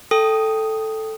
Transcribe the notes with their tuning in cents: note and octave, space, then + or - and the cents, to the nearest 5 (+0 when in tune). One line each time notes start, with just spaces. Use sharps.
A4 +0 G5 +0 D#6 +0